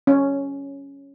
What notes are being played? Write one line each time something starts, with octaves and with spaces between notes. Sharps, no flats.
C#4